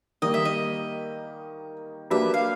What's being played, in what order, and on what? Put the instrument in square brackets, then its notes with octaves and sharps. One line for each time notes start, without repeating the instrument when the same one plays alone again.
[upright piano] D#3 G3 A#3 [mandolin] D#5
[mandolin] E5
D#5
[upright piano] F#3 A#3 D4 G4 B4 [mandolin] E5
[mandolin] F5